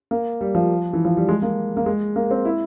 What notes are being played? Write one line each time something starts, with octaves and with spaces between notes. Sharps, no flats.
A#3
G3
F3
E3
F3
G3
G#3
A#3
A#3
G#3
A#3
C4
E4